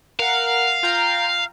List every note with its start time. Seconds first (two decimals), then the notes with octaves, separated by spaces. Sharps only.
0.19 A#4 F5 F#5
0.83 F4 G5 A#5